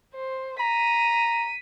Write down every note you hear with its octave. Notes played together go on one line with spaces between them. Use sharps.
C5
A#5 B6 D#7